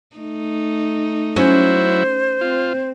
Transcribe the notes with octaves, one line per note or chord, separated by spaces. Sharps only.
A3 D#4
F#3 C#4 E4 C5
C4 F4